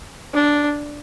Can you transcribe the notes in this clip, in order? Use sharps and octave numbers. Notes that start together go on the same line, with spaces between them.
D4